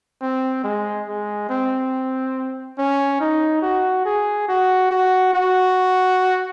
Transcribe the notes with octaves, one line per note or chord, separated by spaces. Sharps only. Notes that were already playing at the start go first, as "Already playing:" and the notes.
C4
G#3
G#3
C4
C#4
D#4
F#4
G#4
F#4
F#4
F#4